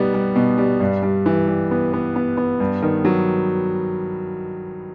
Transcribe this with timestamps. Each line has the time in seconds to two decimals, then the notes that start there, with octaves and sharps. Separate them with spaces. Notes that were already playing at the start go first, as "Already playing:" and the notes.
Already playing: B2 G3 B3 D#4
0.14 G3
0.36 B2
0.58 G3
0.80 G2
1.03 G3
1.26 E3
1.48 G3
1.71 B3
1.93 B3
2.16 B3
2.37 B3
2.60 G2
2.83 D#3
3.05 F#3